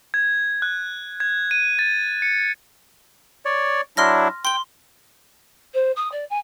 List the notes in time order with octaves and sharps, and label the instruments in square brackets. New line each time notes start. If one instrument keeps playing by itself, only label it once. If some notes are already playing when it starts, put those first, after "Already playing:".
[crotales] G#6
F#6
G#6
D#7
A6
C#7
[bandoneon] C#5 D5
[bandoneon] F#3 D4 E4 [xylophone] C6 F6 A#6
[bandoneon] G5 [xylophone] C6 G7
[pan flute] C5
D#6
D5
G#5